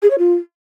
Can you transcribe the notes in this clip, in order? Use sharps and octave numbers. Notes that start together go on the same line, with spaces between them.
G#4
C#5
F4